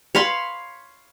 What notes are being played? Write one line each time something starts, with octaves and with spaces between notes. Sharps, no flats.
C#5 F5 B5 C6